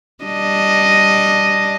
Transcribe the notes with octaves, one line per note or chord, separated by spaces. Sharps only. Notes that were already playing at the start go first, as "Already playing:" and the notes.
G3 D4 D#5